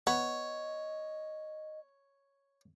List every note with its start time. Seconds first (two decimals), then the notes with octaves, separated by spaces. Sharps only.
0.07 B3 C#5 D#5